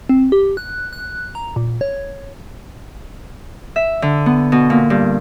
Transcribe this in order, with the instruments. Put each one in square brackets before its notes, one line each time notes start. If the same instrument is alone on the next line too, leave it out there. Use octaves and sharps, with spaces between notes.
[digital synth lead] C4
G4
F#6
F#6
A#5
A#2
C#5
[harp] E5
D3
B3
B2
A#2
G2